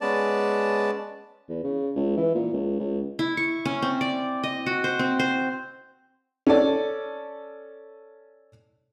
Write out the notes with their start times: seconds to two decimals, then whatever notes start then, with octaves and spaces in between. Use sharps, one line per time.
0.01 G#3 B3 C#4 D5 A5
1.49 E2
1.64 C#3
1.96 C#2
2.17 E3
2.35 A#2
2.53 C#2
2.80 C#2
3.19 E4
3.37 C#6
3.65 C#4
3.82 C4
4.01 D5
4.44 D#5
4.66 F#4
4.84 C5
4.99 C4
5.19 C5
6.47 C#4 A4 D5